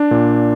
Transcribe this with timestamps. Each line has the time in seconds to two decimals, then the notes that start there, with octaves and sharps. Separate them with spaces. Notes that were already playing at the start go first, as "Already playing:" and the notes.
Already playing: D4
0.11 A#2